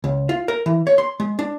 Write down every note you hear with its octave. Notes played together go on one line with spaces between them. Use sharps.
C#2
F4
A#4
E3
C#5
C6
G#3
D4